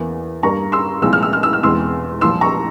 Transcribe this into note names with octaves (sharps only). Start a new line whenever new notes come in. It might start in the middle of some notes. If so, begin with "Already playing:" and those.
Already playing: E2 E3 A#3
G2 G3 A#3 A#5 C#6
C6 E6
C2 A#2 F3 G#3 C4 E6
F6
E6
F6
E6
F6
E1 E2 E3 G#3 C4 C6 E6
C2 A#2 F3 C6 E6
A#5 C#6